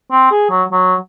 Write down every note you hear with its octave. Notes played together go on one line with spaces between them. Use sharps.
C4
G#4
F#3
F#3